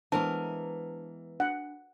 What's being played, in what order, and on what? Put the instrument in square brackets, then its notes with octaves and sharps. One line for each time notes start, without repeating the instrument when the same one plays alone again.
[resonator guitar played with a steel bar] E3 A#4 [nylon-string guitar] G#3 B3 [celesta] D4 C5 A5
[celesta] D4 [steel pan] F#5